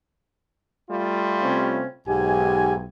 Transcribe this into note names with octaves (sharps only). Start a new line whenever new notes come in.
G3 A3 F4
C3 C4 C#4
B1 G#2 G4 G#5